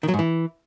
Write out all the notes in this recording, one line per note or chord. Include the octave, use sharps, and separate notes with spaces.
D#3
F#3
G#2
E3